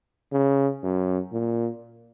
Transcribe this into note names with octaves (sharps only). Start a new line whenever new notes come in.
C#3
F#2
A#2